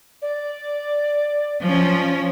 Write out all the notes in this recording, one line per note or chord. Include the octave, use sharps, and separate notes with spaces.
D5
F3 C#4